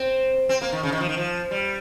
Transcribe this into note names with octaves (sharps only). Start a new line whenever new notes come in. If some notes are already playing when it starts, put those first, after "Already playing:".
Already playing: C4
C4
A#3
D#3
C#3
D#3
F3
D#3
F3
G3